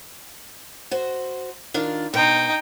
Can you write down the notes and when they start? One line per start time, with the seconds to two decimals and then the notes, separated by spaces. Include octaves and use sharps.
0.91 F#4 C5
1.74 D#3 D4 F4
2.14 B2 D#4 G5